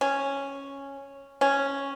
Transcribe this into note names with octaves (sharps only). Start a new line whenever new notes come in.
C#4
C#4